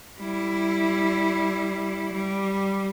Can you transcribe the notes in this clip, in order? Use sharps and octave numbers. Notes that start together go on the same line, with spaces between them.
G3 E4
G3